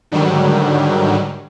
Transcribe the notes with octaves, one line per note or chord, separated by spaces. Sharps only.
G#2 D3 D#3 F#3 G3